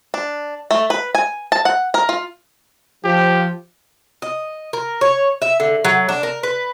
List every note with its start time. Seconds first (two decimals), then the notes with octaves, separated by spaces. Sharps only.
0.14 D4
0.71 A3
0.90 B4
1.15 G#5
1.52 A5
1.65 F#5
1.94 A#4
2.09 F4
3.04 F3 G4
4.22 D#5
4.73 A#4
5.01 C#5
5.42 E5
5.60 D3
5.85 F#3
6.09 D4
6.23 A#4
6.43 B4